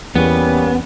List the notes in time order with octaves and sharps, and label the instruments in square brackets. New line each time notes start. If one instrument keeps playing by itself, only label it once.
[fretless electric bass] E2 [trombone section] G3 A#3 C#4 [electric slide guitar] B3